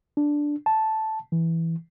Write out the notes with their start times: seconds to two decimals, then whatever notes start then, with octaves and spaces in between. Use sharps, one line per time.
0.17 D4
0.66 A5
1.32 E3